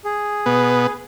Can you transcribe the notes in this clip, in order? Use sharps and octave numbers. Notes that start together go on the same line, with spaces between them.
G#4
B2 B3